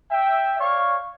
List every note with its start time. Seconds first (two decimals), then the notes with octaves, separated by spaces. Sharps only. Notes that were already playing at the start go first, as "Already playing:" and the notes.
0.11 E5 G5
0.59 C#5 D5 F5 C#6